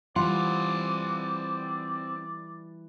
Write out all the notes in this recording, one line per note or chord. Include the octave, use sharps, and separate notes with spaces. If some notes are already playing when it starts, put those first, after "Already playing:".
E3 G3 C4 F4 D5 F#5 C6